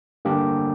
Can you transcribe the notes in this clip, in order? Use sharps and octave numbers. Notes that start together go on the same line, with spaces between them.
D3 G3 A#3 D4 G4